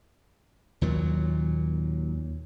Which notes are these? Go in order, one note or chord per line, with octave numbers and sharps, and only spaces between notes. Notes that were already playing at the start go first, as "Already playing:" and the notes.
D#2 A#2 F#3